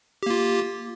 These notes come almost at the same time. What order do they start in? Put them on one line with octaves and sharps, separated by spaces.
G4 A#3 F4